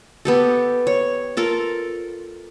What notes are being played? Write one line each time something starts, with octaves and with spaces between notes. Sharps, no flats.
B3 G4 A4
C#5
F4 A4 A#4